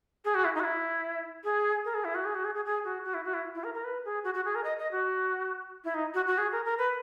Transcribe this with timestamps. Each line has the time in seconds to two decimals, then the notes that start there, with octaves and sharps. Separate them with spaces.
0.25 G#4
0.35 F#4
0.44 E4
0.55 D#4
0.60 F#4
0.64 E4
1.44 G#4
1.85 A#4
1.94 G#4
2.05 E4
2.15 F#4
2.25 G#4
2.35 F#4
2.45 G#4
2.55 G#4
2.65 G#4
2.84 F#4
3.04 F#4
3.14 E4
3.24 F#4
3.34 E4
3.55 E4
3.64 A#4
3.74 A#4
3.84 B4
4.05 G#4
4.24 F#4
4.34 F#4
4.45 G#4
4.55 A#4
4.64 D#5
4.79 D#5
4.92 F#4
5.84 E4
5.94 D#4
6.14 F#4
6.27 F#4
6.38 G#4
6.52 A#4
6.65 A#4
6.78 B4